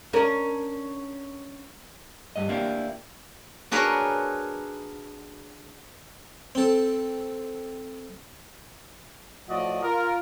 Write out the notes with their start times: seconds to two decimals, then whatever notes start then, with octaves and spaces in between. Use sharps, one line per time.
0.13 C#4 D4 A#4
2.36 G2 D#5
2.49 A#3 D4 E4 G4
3.71 D4 F#4 G#4 A#4 B4 C#5
6.55 C4 A4
9.48 A2 F3 F#4 D5 D#5
9.83 F4 A#4